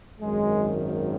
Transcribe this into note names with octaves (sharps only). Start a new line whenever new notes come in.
G#1 F#2 D#3 G#3